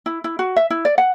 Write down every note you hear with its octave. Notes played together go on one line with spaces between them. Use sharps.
E4
E4
F#4
E5
E4
D5
F#5